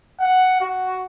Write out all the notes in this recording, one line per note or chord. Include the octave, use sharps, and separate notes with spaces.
F#5
F#4